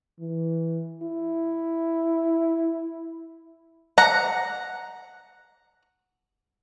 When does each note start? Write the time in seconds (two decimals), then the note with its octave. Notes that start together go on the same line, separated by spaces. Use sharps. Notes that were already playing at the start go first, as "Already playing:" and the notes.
0.20 E3
1.03 E4
3.98 F#5 A#5